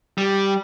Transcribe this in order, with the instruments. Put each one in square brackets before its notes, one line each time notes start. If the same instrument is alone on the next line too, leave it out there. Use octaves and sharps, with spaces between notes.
[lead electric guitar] G3